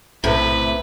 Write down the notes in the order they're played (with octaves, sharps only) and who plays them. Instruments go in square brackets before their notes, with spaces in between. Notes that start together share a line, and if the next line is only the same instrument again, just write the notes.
[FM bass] B1 [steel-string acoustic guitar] A2 C3 [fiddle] B4 [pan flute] E5